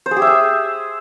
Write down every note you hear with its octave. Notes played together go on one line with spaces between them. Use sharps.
C5
G#4
G4
E5
G#4